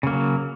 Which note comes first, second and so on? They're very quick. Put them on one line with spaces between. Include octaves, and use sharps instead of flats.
C#3 A#3 F#3